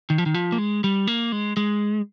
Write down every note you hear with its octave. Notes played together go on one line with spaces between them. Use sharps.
D#3
F3
D#3
F3
A#3
G#3
G3
A#3
G#3
G#3